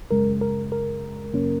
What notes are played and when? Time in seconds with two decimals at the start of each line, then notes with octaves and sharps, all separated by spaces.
0.10 G#1 F#2 C#3 G#3 A#4
0.41 A#4
0.72 A#4
1.33 F#2 C#3 A#3 C#4